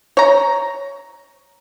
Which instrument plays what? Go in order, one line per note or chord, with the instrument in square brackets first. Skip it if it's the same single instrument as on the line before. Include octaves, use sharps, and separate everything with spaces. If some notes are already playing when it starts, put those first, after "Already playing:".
[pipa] C#5 A#5